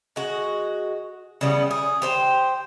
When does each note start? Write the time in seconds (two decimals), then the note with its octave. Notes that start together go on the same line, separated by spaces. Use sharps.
0.16 G#3 F#4
1.41 C#3 E3 G3 B3
1.71 G#4
2.02 G4 C5 G5